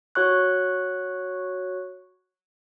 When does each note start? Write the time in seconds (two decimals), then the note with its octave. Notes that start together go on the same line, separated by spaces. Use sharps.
0.15 F#4 C#5 C#6 F#6